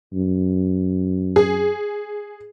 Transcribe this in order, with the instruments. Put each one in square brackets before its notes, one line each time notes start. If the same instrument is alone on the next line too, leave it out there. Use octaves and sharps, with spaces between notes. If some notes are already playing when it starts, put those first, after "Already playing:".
[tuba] F#2
[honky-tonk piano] G#4